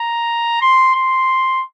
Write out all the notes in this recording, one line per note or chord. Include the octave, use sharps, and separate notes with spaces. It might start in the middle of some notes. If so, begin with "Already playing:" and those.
Already playing: A#5
C6
C6